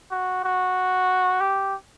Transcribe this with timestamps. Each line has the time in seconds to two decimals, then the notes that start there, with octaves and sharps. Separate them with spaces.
0.11 F#4
0.44 F#4
1.41 G4